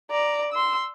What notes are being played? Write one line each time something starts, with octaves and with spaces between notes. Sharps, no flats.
D5 A#5
C6 E6